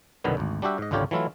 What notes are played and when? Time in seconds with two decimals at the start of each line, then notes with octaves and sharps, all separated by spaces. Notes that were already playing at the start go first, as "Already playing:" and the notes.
0.24 C2 F#2 B2 D3 D#3 B3
0.37 G#1 D2
0.62 G3 D4 F#4 G4 E5
0.78 G#2 D#5
0.91 G#1 C#2 D3 F4 G4 C#5
1.11 E3 F#3 A3 E4 F4